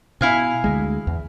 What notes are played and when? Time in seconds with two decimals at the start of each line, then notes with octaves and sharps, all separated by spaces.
0.21 B2 E4 F5 G#5
0.64 D2 G#3
1.07 E2